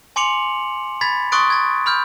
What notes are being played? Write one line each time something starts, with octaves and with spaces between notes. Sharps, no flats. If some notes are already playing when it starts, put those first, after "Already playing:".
G#5 C6 D6 C#7 F7 F#7
B5 G#6 A6 B6
C6 C#6 D#6 F#6 A6 D7
G#6 A6
B5 F6 G6